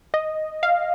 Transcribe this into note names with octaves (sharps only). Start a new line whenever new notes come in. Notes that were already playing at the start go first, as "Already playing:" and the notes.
D#5
F5